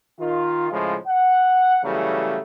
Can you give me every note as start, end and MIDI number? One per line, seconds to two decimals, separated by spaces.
0.20 0.68 51
0.20 0.68 65
0.72 0.96 45
0.72 0.96 49
0.72 0.96 53
0.72 0.96 56
1.08 1.78 78
1.84 2.39 49
1.84 2.39 52
1.84 2.39 54
1.84 2.39 55
1.84 2.39 57